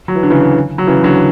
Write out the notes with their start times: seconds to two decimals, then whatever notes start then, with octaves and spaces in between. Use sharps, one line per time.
0.08 F#3
0.16 E3
0.23 D3
0.30 C#3 E3
0.78 F#3
0.87 C#3 E3
1.04 D3 F#3